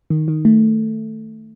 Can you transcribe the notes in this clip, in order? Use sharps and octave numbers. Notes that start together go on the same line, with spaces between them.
D#3
D#3
A3